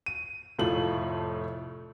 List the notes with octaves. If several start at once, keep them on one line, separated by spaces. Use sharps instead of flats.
D#7
F1 A2 A3 F4 F#7